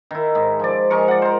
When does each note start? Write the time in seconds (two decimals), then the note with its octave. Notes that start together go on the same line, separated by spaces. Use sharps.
0.11 D#3 E4
0.35 G#2
0.60 F3 D5
0.90 F3 G#3 A#4 C#6
1.08 D5 F#5
1.22 A#4 C5